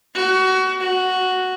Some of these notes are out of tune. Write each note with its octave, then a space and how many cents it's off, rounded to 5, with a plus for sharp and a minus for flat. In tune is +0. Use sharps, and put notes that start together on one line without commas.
F#4 +25
F#4 +0